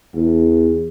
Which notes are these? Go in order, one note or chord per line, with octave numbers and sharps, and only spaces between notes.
E2